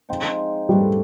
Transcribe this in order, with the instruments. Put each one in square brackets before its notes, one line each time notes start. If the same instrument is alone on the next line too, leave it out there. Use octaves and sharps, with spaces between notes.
[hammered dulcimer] F3 G#3 C4 D#4
[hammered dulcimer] E3 A3 D4 [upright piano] G3